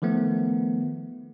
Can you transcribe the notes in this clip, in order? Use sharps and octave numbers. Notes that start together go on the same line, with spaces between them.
D#3 F3 A3 B3